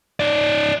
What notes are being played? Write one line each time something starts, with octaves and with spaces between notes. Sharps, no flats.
D#4 D5